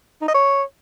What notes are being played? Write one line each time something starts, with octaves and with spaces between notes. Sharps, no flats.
D#4
D#5
C#5